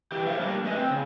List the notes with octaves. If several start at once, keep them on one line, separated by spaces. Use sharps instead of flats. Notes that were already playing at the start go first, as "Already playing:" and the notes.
E3 G4
G4 A#4 C5 C#5 E5 F5
G3 A#3 D4
A3 B4 D#5 G#5
C4
C#3